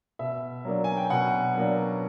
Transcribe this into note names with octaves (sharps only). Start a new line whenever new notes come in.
B2 E5
F#3 A#3 D4
G#5
G5
B2 F#5
F#3 A#3 D4